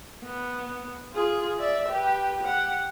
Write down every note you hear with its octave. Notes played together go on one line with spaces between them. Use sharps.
B3
F4 G#4
D5 E5
G4 B4
G4 F#5